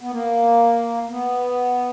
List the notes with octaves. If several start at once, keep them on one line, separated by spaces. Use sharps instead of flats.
B3
A#3
B3